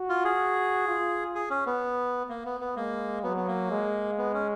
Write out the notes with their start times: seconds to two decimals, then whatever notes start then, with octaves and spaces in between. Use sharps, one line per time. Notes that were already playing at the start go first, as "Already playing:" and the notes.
Already playing: F#4
0.10 F4
0.25 G#4
0.88 F4
1.35 G#4
1.50 C#4
1.66 B3
2.29 A#3
2.45 B3
2.61 B3
2.76 G#3 A#3
3.24 F#3 B3
3.37 B3
3.47 A#3
3.71 G#3
4.18 B3
4.34 C#4